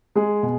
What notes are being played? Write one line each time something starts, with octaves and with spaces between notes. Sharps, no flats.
G#3 G#4
B2